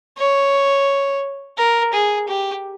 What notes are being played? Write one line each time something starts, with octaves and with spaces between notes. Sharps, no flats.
C#5
A#4
G#4
G4